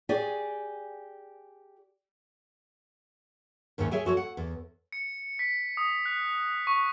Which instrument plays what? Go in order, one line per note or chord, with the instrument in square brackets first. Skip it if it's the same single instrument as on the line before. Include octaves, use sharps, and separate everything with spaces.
[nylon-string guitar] G4 G#4 D5 G#5
D#2 G#2 C3 D#3 C#4
G#4 C#5 E5 G5 G#5
F3 F#4 A4 C#5
F#5
E2
[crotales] C#7
B6
D#6
F#6
C#6